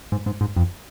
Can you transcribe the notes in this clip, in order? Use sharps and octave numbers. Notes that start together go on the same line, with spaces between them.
G#2
G#2
G#2
F2